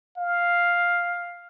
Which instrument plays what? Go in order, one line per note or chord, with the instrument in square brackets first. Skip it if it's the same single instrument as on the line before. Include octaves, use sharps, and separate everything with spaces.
[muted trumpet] F5